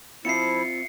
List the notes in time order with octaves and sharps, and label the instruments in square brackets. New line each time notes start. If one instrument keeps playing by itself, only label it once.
[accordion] F3 E4 [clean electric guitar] C4 F4 E5 [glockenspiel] C7 C#7